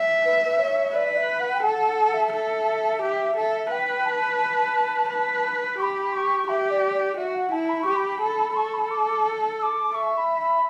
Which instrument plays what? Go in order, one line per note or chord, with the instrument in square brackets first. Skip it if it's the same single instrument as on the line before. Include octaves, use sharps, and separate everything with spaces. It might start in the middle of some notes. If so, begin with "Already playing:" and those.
Already playing: [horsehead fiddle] E5
[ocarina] B4
B4
C#5
[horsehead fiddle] B4 [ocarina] D5
[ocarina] D5
E5
F#5
G5
[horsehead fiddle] A4 [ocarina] F#5
[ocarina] F#5
F#5
E5
[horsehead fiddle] A4
G4
A4
[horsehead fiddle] B4 [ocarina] G5
[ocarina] A5
[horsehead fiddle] B4
[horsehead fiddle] G4 [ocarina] C#6
[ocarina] B5
D6
C#6
[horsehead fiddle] G4 [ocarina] E5
[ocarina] D5
D5
[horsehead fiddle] F#4 [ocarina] E5
[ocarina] F#5
[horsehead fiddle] E4 [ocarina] A5
[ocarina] B5
[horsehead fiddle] G4 [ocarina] C#6
[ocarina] B5
[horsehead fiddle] A4
[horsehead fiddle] A4 [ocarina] C#6
[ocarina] B5
D6
D6
E6
D6
[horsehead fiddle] E5 [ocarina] C#6
[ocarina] B5
B5